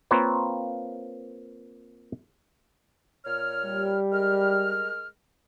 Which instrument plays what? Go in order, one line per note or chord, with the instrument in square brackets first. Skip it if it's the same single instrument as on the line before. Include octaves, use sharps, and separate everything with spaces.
[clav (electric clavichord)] A#3 C4 F4 A#4 B4 C#5
[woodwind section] A#2 C#5 F6
[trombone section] G3
[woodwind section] G#3 A#4 F6